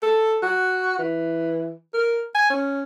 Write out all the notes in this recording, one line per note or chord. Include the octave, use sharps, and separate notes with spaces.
A4
F#4
E3
A#4
G#5
C#4